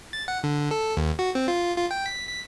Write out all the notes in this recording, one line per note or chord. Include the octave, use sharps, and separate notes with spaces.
A6
F#5
D3
A4
D#2
F#4
C4
F4
F4
G5
B6
B6